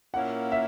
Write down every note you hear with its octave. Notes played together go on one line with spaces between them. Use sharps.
A#2 A#3 C#4 E4 F#5
E5